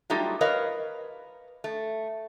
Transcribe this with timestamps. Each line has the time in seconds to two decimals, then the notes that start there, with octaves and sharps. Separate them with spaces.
0.10 F#3 G3 A3 D#4 F4 G4
0.41 A#4 B4 C#5 D#5 F5
1.64 A3